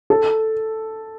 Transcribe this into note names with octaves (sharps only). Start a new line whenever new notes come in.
A4